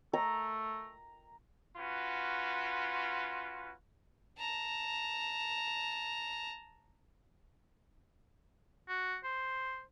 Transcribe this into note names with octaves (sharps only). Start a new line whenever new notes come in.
A3 A#5
C#4 F4 F#4 B4
A5 A#5
F#4
C5